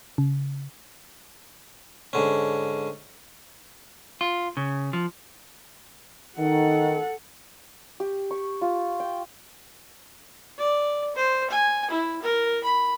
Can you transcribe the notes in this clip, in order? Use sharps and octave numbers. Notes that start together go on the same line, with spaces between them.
C#3
G#2 D3 C#4
F4
C#3
F3
D#3 A4 F#5
G4
C#6
F4
G5
D5
C5
G#5
E4
A#4
B5